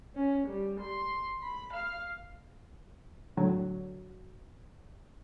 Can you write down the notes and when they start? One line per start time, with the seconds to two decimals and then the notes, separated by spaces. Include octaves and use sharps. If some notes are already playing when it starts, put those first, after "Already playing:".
0.15 C#4
0.47 G3
0.80 C6
1.42 B5
1.74 F5
3.37 A2 D3 F#3